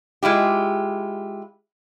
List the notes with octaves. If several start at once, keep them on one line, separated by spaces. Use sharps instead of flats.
G#3 E4 F4 G4